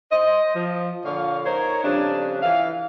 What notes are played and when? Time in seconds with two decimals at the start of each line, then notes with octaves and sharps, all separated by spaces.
0.12 C5 D#5
0.56 F3
1.05 A#2 D3 C#5 F5
1.46 D#4 A#4 C5 C#5
1.84 F2 C#3 G3 D4
2.42 E3 F5